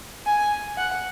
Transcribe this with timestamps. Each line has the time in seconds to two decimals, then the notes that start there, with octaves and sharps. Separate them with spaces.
0.26 G#5
0.78 F#5